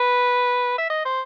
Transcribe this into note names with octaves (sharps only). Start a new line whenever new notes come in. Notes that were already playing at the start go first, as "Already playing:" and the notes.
Already playing: B4
E5
D#5
C5